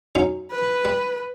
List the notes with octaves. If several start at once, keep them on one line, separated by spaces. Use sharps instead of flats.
F#3 C#4 D#4
B4
G3